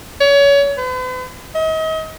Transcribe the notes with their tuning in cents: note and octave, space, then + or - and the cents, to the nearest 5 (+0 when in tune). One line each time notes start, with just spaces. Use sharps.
C#5 +30
B4 +45
D#5 +40